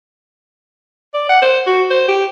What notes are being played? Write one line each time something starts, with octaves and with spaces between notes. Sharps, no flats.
D5
F#5
C5
F#4
C5
G4